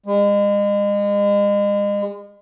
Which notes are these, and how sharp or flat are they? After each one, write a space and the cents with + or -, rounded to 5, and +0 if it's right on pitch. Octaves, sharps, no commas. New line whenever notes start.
G#3 -35